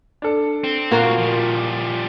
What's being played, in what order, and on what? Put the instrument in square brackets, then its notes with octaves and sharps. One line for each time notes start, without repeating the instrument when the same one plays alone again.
[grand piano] D4 A4
[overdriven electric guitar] C4
[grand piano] A#2 [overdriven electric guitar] A#3 C4 [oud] F4 F#4 A#4
[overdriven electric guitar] F3 G3